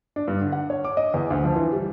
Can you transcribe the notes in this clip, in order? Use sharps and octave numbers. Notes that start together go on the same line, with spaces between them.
D4
G2
D3
F#5
C#5
D6
D#5
E2
D2
F3
E3
G3